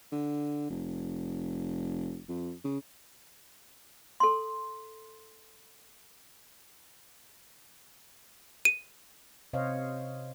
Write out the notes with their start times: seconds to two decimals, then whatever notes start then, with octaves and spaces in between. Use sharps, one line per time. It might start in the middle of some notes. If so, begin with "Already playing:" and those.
0.12 D3
0.70 F1
2.29 F2
2.64 C#3
4.20 A4 C6
8.65 D#7
9.53 C3 C5 C#5 D#5 F5